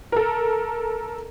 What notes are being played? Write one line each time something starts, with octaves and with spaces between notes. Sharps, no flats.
A4 A#4